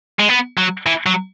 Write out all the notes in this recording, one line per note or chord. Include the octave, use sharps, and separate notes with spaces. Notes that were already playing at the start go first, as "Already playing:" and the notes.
G#3
B3
F#3
E3
F#3